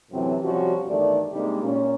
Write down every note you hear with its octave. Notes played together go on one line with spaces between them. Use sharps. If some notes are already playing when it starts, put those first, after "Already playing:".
F#2 A2 C3 E3 F#3 C4
C3 F3 G3 C#4 F#4
E2 G2 D#3 A3 D5
C3 G3 G#3 A#3 D4 D#4
A#2 C#4